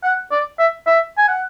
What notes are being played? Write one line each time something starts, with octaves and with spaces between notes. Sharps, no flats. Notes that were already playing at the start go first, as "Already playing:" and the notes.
F#5
D5
E5
E5
G#5
F#5